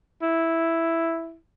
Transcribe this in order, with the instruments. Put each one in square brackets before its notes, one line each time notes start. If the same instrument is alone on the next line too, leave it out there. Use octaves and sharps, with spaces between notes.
[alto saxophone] E4